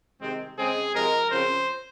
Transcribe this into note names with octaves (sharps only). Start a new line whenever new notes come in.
C3 D#3 G#3 C4
C#3 G#3 C4 G#4
C3 F3 G#3 A#4
C#3 F3 C4 C5